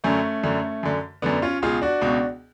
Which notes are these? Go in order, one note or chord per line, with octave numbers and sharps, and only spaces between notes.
F#2 D3 A3 C#4
F#2 D3
F#2 D3
F#2 D3 B3 D4
C#4 F4
C#2 B2 F4 G#4
D4 F#4
C#2 B2